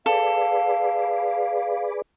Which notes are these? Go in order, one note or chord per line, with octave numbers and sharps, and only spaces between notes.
G#4 A4 B4 D5 F5